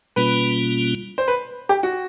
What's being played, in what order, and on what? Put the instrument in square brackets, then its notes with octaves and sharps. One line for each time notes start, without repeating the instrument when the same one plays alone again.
[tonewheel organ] B2 G3 A#3 C#4 F4 [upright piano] B4
[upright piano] C5
B4
G4
F#4